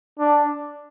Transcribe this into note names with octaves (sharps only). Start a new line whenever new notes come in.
D4